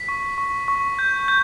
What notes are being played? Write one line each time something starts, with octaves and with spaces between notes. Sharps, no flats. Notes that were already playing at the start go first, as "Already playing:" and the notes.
Already playing: B6
C#6
C#6
C#6
G6
G6